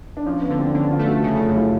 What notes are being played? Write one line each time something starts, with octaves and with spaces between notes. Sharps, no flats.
D4
F3 C#4
B3
D3
C4
D3 C#4
F4
A3
F#4
C#3
F4
F#2
E4